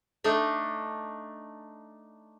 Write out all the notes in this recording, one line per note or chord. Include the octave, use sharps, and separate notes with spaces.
A3 D4 D#4